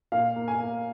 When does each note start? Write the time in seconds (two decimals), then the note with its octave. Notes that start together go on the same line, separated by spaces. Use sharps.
0.12 A#2 F5
0.36 A#3
0.48 G#5
0.59 A#3